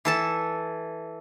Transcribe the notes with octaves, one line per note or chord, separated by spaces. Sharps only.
E3 A4 A5